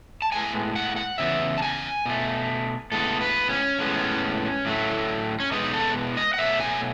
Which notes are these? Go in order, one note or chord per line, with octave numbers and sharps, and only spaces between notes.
A5
A2 G#3 B3 G#5
F#5
F#5
C#3 E3 B3 E5
A5
G#5
B2 A3
A2 G#3 B3 A4
B4
C#4
A2 G#3 B3
A2 F#3 A3
C#4
B2 G#3 B3 D#4
A4
D#5
F#5
B2 F#3 A3 E5
G#5